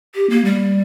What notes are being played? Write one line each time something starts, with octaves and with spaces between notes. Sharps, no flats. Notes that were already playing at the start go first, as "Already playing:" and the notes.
G4
A#3
G3